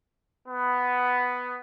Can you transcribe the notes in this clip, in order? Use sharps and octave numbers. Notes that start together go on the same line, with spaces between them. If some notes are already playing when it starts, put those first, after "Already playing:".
B3